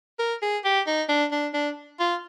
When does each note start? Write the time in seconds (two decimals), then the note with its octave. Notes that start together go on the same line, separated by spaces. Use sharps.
0.19 A#4
0.42 G#4
0.65 G4
0.87 D#4
1.09 D4
1.32 D4
1.54 D4
2.00 F4